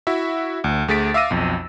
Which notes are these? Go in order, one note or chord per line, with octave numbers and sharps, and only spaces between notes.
E4 F#4 E5
D2
D2 A3 G#4 A6 B6 D7
E5 F5 D6 E6 A#6 D#7
B1 F2